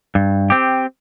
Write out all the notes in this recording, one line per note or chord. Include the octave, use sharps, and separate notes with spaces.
G2
C4 G4